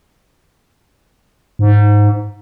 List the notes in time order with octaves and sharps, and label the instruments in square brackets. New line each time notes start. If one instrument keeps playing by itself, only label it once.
[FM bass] G#2